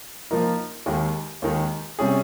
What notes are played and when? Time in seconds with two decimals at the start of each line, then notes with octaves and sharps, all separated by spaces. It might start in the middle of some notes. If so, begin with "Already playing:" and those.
0.31 F3 A#3 D#4 A#4
0.86 D#2 D#3 G#3
1.42 D#2 D#3 G#3
1.99 C3 G3 C#4 G#4